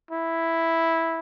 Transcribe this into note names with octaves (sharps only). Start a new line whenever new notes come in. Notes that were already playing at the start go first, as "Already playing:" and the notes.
E4